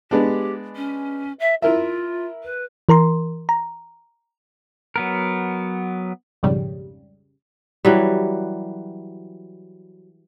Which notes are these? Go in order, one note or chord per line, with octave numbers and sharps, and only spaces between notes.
G#3 B3 D4 G4
C#4
E5
E4 F4 A#4 E5
B4
E3 A#4 A#5 C6
A#5
F#3 B3 A#4
B1 F2 G#2 C#3 G3
E3 F#3 G3